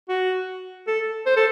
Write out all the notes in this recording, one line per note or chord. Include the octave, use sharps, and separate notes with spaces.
F#4
A4
C5
A4